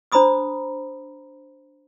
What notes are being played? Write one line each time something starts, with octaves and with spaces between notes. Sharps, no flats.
D4 C5 A#5 B5 D#6 E6